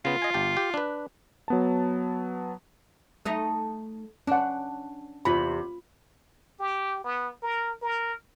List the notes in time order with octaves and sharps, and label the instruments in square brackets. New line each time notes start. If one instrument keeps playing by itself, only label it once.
[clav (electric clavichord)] C#3 B3 [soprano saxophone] F4
[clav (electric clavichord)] D#5 G#5
G1 G4 A5
G4
D4 B4
[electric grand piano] F#3 B3 A5
[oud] A3 D#4
[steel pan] C#4 F#5 [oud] D4
[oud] E2 C3 [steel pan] F4 B5
[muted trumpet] G4
B3
A#4
A#4